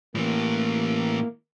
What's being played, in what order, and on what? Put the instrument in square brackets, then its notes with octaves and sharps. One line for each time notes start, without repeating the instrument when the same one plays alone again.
[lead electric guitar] A2 E3 [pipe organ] A#3